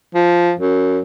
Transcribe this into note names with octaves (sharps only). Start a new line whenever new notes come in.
F3
F#2